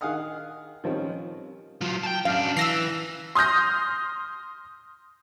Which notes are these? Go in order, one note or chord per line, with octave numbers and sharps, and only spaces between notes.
D#3 G#4 F5 F#5 D#6 F6
D#3 F3 G3 C4 C#4
F#3 F4
G5 A5
F#2 D4 F5
E3 E6 A#6 C7
C6 D#6 F6 G6 A#6